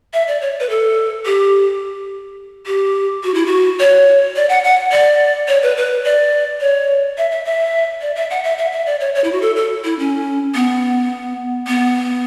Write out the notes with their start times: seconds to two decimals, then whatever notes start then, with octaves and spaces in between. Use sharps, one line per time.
0.14 E5
0.28 D5
0.42 C#5
0.60 B4
0.70 A4
1.26 G4
2.67 G4
3.24 F#4
3.34 E4
3.46 F#4
3.79 C#5
4.36 D5
4.49 F#5
4.64 F#5
4.92 D5
5.48 C#5
5.63 B4
5.77 B4
6.04 D5
6.61 C#5
7.18 E5
7.31 E5
7.45 E5
8.01 D5
8.16 E5
8.30 F#5
8.44 E5
8.58 E5
8.72 E5
8.86 D5
9.00 C#5
9.15 C#5
9.24 E4
9.32 F#4
9.42 A4
9.56 A4
9.85 E4
9.99 C#4
10.55 B3
11.67 B3